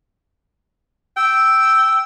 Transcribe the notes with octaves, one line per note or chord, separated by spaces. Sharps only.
G5 E6